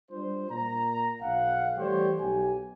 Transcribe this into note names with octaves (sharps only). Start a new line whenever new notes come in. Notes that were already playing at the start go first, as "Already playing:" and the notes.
G3 D4 F4 C5
A#2 A#5
B1 F5 F#5
E3 G3 A3 G4 C5 C#5
B1 G4 G#5